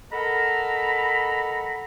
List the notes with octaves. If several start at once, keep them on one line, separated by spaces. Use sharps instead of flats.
A4 A#4 D#5 F#5 A#5 B5